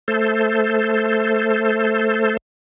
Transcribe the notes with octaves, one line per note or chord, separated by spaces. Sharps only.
A3 A4 C5